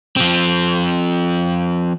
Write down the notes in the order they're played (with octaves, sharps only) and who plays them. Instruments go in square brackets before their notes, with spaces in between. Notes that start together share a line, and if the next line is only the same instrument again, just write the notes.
[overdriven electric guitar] F3 C4